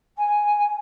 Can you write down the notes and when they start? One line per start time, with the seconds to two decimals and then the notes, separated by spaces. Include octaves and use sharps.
0.18 G#5